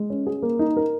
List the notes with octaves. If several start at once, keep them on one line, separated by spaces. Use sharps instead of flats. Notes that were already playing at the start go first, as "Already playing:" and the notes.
Already playing: G#3
C#4
G#4
A#3
D#4
A#4